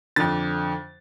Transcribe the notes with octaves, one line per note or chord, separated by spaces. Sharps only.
F2 D3 A6